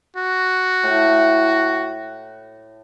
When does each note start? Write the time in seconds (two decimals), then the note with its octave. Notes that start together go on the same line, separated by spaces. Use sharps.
0.16 F#4
0.83 A2